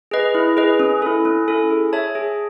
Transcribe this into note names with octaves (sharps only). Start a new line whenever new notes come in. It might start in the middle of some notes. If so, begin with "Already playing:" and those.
G#4 B4 D#5
E4
G#4 B4 D#5
C#4
E4 A4
C#4
E4 A4
G#4
C#5 E5 A5
G#4